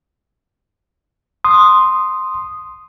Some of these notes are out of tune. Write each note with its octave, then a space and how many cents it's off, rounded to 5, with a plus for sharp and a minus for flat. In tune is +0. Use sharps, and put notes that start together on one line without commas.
C6 +0 D#6 -5